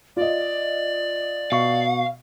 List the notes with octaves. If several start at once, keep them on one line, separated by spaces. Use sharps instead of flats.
F4 D5 D#5
B2 F5 C#6